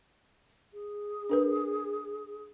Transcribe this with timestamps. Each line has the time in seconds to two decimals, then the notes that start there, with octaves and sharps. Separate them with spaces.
0.74 G#4
1.30 D4 A#4 B4